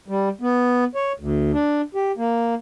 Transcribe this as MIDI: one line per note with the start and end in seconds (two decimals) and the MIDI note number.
0.08 0.29 55
0.41 0.84 59
0.95 1.13 73
1.20 1.52 38
1.53 1.81 62
1.95 2.12 67
2.17 2.55 58